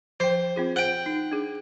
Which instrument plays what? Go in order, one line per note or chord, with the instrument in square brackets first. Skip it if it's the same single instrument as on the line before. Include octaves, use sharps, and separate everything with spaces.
[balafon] F3 G5 [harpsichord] C5
[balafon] C4 F4 G#4
[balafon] C5 [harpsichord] F#5 G5
[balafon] D#4
D4 G#4